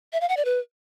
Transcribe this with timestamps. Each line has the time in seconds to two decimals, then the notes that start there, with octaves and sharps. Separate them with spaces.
0.13 E5
0.21 F5
0.29 F#5
0.37 D5
0.45 B4